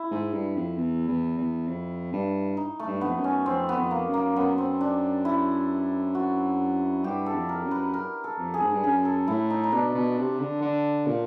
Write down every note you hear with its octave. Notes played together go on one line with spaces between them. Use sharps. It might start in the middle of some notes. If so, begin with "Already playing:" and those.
Already playing: E4
G#2
G2
F2
E2
E2
E2
F2
G2
D#4
A3
G2
F2 B3
F#2
C#4
F2 C4
B3
F2
A#3
F#2
A#3
F#2 B3
C4
D4
E4
F#4
G2 G4
A4
F2
A#4
F#2
B4
A#4
A4
F2
G#4
G#2
G2
F#2 G#4
A4
A2 E4
D#4
D#4
B2 D4
B2
C3
D3
D3
A#2